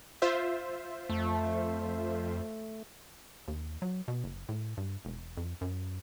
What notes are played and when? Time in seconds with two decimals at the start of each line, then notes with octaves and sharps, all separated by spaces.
0.22 F4 C5 E5
1.09 F2 A3
3.48 D#2
3.82 F#3
4.08 B2
4.24 F#1
4.49 A2
4.77 G2
5.05 E1
5.37 F2
5.61 F#2